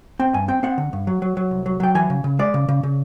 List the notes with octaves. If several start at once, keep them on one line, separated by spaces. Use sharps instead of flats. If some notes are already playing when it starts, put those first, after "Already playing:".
C4 G5
G2 G#5
C4 G5
C4 F#5
D3
G2
F#3
F#3
F#3
C2
F#3
F#3 G5
E3 G#5
C#3
C#3
G#3 D5
C#3
C#3
C#3